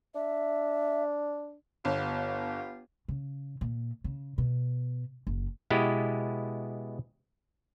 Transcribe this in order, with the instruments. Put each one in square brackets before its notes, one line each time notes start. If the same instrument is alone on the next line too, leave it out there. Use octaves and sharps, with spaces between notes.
[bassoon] D4 [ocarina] E5
[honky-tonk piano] G1 [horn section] B3 F4 G4
[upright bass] C#3
A#2
C#3
B2
F#1
[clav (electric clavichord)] B2 G#3 B3 E4 G4